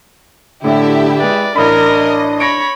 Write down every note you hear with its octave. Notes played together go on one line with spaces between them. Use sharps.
A2 D3 E4 G4 E5
G#3 B4 D5 G5
A1 D4 A#4 D#5 B5
C#5 B5 A#6 C#7 D7